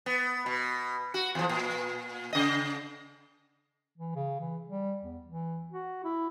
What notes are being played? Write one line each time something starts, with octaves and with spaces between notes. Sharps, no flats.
B3
B2
F#4
E2 F3
A#2
C#3 D#5
E3
C#3
E3
G3
E2
E3
F#4
E4